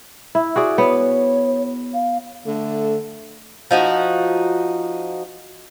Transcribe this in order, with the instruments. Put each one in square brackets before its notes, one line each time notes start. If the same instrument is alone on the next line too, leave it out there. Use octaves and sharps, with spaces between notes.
[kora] E4
F#4 G#4 D5
[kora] B3 [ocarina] C#5
[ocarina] F5
[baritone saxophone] D3 [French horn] A3
[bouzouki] F3 D#4 F#4